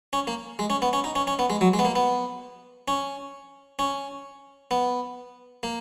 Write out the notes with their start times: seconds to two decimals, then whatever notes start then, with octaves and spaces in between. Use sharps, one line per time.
0.13 C#4
0.27 A#3
0.59 G#3
0.70 C#4
0.82 B3
0.93 C#4
1.04 D#4
1.15 C#4
1.27 C#4
1.39 B3
1.50 G#3
1.61 F#3
1.74 G#3
1.79 B3
1.85 A#3
1.96 B3
2.88 C#4
3.79 C#4
4.71 B3
5.63 A#3